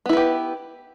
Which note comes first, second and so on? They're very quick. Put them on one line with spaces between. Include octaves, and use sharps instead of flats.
B3 E4 B4 G4